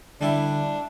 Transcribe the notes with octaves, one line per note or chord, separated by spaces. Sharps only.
D3 G3 D4 E4